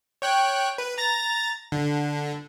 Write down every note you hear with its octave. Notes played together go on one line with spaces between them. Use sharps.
C#5 G5 F#6
B4
A#5 A6 A#6
D3